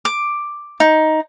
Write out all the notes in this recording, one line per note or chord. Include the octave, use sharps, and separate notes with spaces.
D6
D#4